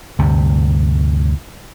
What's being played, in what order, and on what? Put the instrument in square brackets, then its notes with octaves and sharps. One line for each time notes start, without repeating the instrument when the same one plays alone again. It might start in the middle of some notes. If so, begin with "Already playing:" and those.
[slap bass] D2 G2 C3